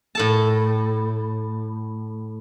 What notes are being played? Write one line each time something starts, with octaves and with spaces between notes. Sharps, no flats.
A2 A4 A5